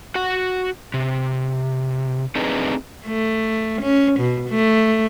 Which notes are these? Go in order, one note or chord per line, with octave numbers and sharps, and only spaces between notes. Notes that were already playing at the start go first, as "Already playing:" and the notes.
F#4 F#5
C3
A3 C4 D4 D#4 G#4 B4
A3
C#4
B2
A3